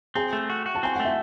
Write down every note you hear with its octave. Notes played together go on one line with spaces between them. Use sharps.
C4 G#4 G#5
A3
F#4
F#4
A5
C4 G#5
A3 F#5
E5